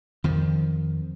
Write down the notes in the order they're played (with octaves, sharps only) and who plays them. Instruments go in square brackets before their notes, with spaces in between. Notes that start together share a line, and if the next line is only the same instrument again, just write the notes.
[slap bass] F2 D#3 F3